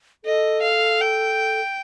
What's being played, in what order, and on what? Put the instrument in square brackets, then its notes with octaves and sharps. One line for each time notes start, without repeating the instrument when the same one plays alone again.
[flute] A4 [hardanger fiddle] D#5
[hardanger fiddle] F5
G5